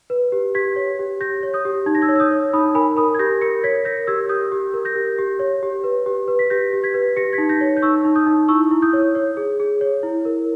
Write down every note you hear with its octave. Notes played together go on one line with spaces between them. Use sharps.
B4
G4
G4 G#6 B6
C#5
G4
G4 G6 A#6
C#5
D#6 G6
G4
D#4 G#6
A#6
E6 G#6
C#5
E6
D#6 G6
C#5
D#4 B5 D#6
A#4 G#5 B5
A#4 B5 D#6
G#6
G4 G6 A#6
A#4 A#6 C#7
C#5 G#6 B6
A#4 G6 A#6
G4 E6 G#6
G4 D#6 G6
G4
A#4
G6 A#6
G4
G4
C#5
G4
B4
G4
B4
B6
G4 G6 A#6
G4
G#6 B6
B4
G4 A#6 C#7
G#6 B6
D#4
G6 A#6
C#5
G6
D#4 C#6 E6
D#4
D#6 G6
D#4
E4 C#6 E6
E4
D#6 G6
C#5
C#5
G#4
G#4
C#5
E4
A#4